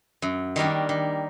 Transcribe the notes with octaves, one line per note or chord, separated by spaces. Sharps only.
F#2
D#3 G3 A#3 D4
D#3